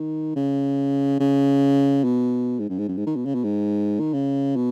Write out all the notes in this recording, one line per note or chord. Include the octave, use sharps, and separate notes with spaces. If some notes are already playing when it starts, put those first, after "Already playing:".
Already playing: D#3
C#3
C#3
B2
G#2
F#2
G#2
F#2
G#2
D#3
B2
C#3
B2
G#2
D#3
C#3
B2